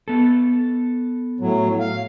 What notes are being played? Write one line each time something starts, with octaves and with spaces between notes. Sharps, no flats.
B3 A4
A2 F#3
F5